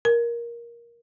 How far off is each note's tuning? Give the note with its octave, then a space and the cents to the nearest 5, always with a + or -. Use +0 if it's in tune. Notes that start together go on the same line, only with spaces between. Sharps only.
A#4 +15